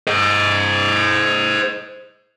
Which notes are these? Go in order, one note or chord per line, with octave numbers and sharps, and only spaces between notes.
C5 D#5